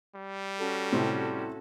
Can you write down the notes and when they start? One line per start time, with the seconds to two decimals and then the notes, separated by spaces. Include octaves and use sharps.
0.16 G3
0.58 C#4 F#4 A4
0.92 A2 C3 C4